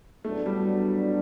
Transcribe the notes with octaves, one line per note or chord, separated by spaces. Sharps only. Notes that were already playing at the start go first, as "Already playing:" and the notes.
A2 F#3 A3 B3 D4 F#4
G3